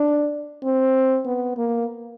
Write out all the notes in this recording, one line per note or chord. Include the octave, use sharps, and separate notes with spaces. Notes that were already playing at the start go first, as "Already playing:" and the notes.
Already playing: D4
C4
B3
A#3